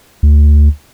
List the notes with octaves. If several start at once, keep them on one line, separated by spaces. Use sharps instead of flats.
D2